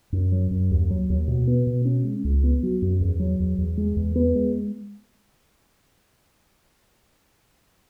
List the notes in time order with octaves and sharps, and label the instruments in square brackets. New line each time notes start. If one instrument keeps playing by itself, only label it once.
[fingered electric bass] F#2
F#3
F#2
D#2
F#3
D#2
B2
B3
B2
C#4
G#3
C#2
B3
F#3
F#2
E2
F#3
E2
E2
G#3
E2
B3
G#3